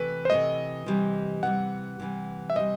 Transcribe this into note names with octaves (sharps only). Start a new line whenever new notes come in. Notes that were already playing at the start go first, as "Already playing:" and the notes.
Already playing: C3 E3 A3 B4
C5
C3 E3 A3 D#5
C3 E3 G3
C3 E3 G3 F#5
C3 E3 G3
E5
C3 E3 G3 D#5